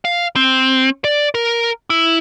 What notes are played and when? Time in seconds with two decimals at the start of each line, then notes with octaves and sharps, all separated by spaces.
0.05 F5
0.36 C4
1.04 D5
1.35 A#4
1.90 E4